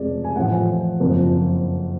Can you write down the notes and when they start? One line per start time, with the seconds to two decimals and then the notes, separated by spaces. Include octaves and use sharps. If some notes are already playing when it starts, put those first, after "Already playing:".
Already playing: F1 F2 C#3 G#3 D5
0.24 G#5
0.36 A1 A2 F3 F#5
1.00 F#1 F2 F3